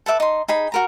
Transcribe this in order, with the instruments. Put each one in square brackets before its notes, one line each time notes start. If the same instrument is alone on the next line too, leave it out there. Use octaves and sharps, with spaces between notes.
[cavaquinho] A4 B4 E5 D6
D#4 C6
D#4 G#4 B5
F#4 A#4 A#5